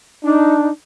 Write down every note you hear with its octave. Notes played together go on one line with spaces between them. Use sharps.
D4 D#4